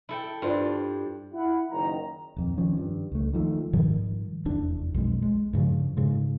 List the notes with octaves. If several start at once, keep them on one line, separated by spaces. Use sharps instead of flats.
E4 A4 G5
G2 F4 C5 D5
E4 F#5
F#1 D#3 A#5
D#1 F2
D#3 F3 C#4
G2
C#2 A3
D#3 F3 F#3 A3
G#2 D#3 F3 G3
F1 E2 D4
B1 F2 G#3
G#3
G2 C#3 F3
G#2 C#3 G#3